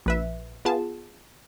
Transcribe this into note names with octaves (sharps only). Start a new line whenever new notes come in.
A#1 B4 E5
B3 F4 G#4 A5